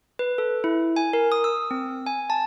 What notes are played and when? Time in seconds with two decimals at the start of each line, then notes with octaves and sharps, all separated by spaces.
0.19 B4
0.38 A4
0.64 E4
0.96 G#5
1.13 A#4
1.32 D#6
1.44 E6
1.71 C4
2.06 G#5
2.30 A5